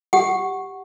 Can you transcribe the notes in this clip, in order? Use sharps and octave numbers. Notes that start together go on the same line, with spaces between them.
G4 F#5